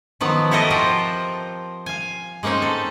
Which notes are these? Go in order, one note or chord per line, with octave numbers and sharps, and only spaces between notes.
D#3 F3 F#3 B3
E4 F#4 G4 A4 A#4 D#5
F3 C4 F4 A#4 C5
F5 G#5
G#3 A#3 C4 C#4 D#4
A4